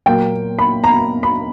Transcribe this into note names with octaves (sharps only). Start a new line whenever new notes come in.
A#2 F#3 A#3 G5
B5
A#5
B5